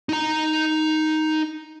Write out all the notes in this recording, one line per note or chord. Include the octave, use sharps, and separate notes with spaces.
D#4 A#5